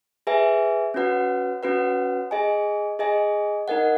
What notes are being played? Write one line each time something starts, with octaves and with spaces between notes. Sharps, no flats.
G#4 B4 E5 G#5
C#4 F#4 B4 F#5
C#4 F#4 B4 F#5
G#4 D#5 G#5
G#4 D#5 G#5
D#4 A#4 D#5 F#5